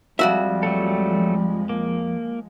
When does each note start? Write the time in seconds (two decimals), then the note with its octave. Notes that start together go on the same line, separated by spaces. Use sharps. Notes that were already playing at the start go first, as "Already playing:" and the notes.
0.19 F2 F3 G3 G#3 F#4 E5
0.63 F#3 A3 A4
1.69 A#3